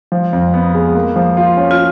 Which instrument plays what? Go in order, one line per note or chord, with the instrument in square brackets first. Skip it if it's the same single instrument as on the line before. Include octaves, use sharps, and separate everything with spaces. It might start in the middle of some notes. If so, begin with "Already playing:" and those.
[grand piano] F3
F2
B3
G#3
A#3
F3
F4
C#4
[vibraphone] F4